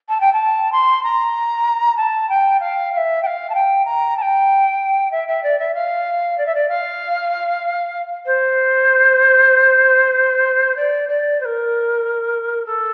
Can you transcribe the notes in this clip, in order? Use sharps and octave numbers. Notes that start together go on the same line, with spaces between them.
A5
G5
A5
C6
A#5
A5
G5
F5
F5
E5
G5
F5
A5
G5
A#5
A5
G5
E5
E5
D5
E5
F5
D5
E5
D5
F5
C5
D5
D5
C5
A#4
A4